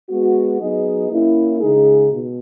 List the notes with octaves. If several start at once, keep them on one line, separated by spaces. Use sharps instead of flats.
G#3 B3 F#4
F#3 B3 D#4 G#4 D#5
A#3 C#4 E4
C#3 G#3 D#4 G#4
B2